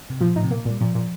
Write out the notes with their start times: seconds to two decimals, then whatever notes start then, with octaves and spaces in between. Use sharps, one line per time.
0.10 C3
0.21 A#2 F3
0.36 A2 D#4
0.43 C3
0.51 A#2 A#3
0.65 A#2 G3
0.81 A#2 F3
0.95 A#2